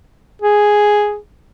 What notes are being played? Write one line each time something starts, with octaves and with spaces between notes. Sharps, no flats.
G#4